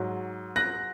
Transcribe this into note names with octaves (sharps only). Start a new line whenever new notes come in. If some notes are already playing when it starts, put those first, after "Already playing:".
Already playing: G#2 F#3
F#6 A#6